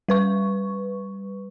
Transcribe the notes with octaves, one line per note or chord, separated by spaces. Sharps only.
G3 B4 C#6